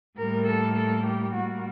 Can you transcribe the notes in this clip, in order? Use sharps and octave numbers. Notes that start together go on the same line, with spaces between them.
A2 G3 A#3 A#4
A4
A4
G4
A2 G3 A#3 F#4